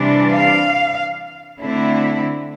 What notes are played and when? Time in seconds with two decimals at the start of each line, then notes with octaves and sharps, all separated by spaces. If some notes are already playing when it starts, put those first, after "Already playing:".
Already playing: C3 E3 G3 D4
0.33 F5
1.61 D3 A3 C4 E4